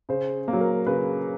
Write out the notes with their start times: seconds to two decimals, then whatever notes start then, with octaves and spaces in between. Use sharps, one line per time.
0.09 C#3 C5
0.48 A#3
0.53 F#3
0.61 A#4
0.86 C#3 B4